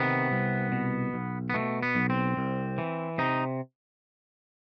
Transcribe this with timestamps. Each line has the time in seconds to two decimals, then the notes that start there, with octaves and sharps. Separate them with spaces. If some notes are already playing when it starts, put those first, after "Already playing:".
Already playing: C3 D#3 B3
0.32 C2
0.72 B2
1.14 B1
1.50 B3
1.54 B2 A3
1.83 B3
1.95 B1
2.10 C4
2.37 C2
2.78 E3
3.18 C3 D#4